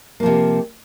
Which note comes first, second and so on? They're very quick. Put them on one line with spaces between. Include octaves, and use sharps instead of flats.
A#3 F3 C3